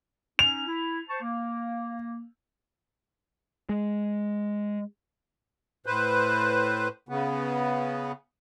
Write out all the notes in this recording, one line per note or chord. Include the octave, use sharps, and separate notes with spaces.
C#4 D#4 F7
E4
C5 A5 C#6
A#3
G#3
A2 B4 C5
C#3 B3